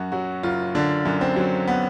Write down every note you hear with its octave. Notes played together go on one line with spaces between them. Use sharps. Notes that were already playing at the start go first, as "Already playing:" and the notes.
Already playing: F#2 F#4
F#3 F#4
F#1 F4
D3 D4
F#2
C4
F#3
B3